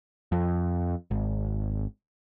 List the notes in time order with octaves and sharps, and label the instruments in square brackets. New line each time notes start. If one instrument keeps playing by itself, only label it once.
[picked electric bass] F2
G#1